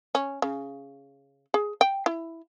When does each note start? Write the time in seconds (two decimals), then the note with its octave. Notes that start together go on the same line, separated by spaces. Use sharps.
0.15 C#4
0.42 C#3
1.54 G#4
1.81 G5
2.06 E4